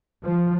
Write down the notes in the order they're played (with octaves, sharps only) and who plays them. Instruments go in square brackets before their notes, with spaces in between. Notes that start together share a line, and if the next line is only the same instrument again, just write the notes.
[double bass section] F3